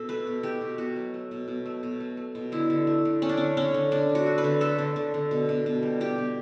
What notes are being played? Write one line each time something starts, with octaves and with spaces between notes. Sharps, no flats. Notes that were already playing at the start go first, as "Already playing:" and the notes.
Already playing: B2 A4
A3 B4
B2
A3 G4
B2
B2 F#4
F#3
A3
B2
B2
A3
B2
A3
A3
B2
D3 E4
D3
A3
D3
A3 C#4
D4
D3 C#4
D3 C#4
D3
D3 D4
D3
F#4
A3
B4
D3
A3 A4
D3
D3
D3
B2
B2
B2
G3
B2 G4
B2